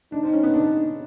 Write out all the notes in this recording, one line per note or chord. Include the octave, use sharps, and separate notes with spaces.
D4 D#4
C4
C#4
B3
D4